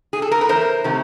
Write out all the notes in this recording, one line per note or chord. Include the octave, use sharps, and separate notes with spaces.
G#4
A4
A#4
B4
E2 A#4 C5
C3 D#3 F#3 A3